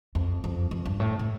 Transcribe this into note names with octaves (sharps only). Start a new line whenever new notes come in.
F2
F2
F2
G2
A2
A2